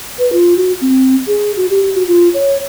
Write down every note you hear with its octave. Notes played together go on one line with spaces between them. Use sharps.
B4
F4
F#4
C4
G#4
F#4
G4
F#4
F4
C#5